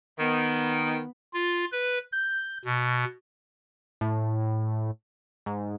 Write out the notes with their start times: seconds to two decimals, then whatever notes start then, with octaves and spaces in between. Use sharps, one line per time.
0.20 D#3 B3
1.34 F4
1.72 B4
2.12 G6
2.65 B2
4.01 A2
5.46 G#2